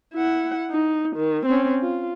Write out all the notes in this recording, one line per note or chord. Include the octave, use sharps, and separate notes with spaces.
E4 F#5
D#4
D#3
C4 C#4
F4